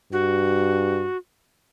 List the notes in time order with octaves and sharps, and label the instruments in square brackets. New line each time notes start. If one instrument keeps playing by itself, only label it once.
[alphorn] G2 [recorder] F#4